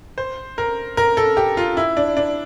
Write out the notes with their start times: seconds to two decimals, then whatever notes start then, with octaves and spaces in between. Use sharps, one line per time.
0.18 C5
0.58 A#4
0.97 A#4
1.17 A4
1.37 G4
1.57 F4
1.77 E4
1.97 D4
2.17 D4